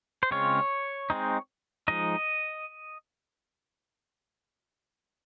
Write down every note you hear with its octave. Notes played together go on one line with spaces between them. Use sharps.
C5
C#3 G#3 C4 F4 C#5
G#3 C4 D#4
F3 G#3 D#4 D#5